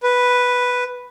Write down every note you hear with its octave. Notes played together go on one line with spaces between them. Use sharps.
B4